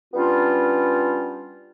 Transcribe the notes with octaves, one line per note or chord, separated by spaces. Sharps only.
G3 B3 C#4 D4 F4